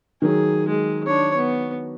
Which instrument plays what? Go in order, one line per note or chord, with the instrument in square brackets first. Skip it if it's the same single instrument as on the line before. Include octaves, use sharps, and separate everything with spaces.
[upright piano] D#3 F#3 [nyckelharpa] G#4
[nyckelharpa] G#3
D4 C#5
B3